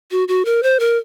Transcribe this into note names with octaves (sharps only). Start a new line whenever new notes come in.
F#4
F#4
A#4
C5
A#4